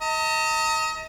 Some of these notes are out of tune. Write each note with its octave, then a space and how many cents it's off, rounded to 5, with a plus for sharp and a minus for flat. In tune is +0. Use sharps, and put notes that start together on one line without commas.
D#5 +30 A#5 -40